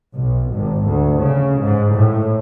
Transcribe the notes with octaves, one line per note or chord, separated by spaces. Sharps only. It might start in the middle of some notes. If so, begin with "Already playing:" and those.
B1
G#1
D2
C#3
G#2
A2